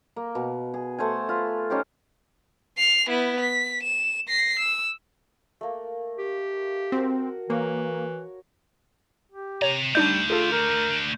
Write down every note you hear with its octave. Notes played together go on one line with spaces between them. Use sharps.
A#3
B2
G#4
A3 C5 F#5 G#5
F4 B4
C#4 D#4 G4 C5
C7 F7
B3 E4
B6
E7
A#6 C7
E6
A3 A#3
G4
C4 F#4 A#4
E3 A#3 C#5
G4
C3 C#5 A#5
D3 G3 A3 D4 D#4 D5 G6
F4 G#4 A4
A#4